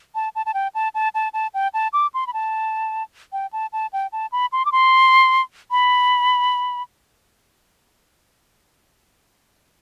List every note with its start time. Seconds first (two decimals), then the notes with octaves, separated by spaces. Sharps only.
0.15 A5
0.35 A5
0.46 A5
0.54 G5
0.75 A5
0.95 A5
1.15 A5
1.33 A5
1.54 G5
1.74 A5
1.93 D6
2.14 C6
2.27 B5
2.33 A5
3.33 G5
3.53 A5
3.73 A5
3.93 G5
4.12 A5
4.32 B5
4.52 C6
4.65 D6
4.72 C6
5.71 B5